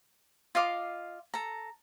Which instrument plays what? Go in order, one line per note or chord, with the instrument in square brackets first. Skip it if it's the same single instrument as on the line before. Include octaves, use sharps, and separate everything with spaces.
[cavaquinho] F4 D#5 F5 D6
A4 A#5